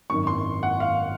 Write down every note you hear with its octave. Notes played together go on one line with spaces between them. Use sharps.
G#1 F#2 D#3 C#6
C6
F#5
F5